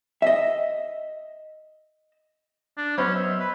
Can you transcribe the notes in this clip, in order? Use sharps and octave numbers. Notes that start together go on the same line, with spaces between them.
D#5 E5
D4
F#3 B3 C#4 C5 D#5 B5
E5
B4